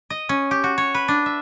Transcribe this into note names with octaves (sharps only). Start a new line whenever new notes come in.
D#5
C#4
G4
F#4
C#5
B4
D4
E5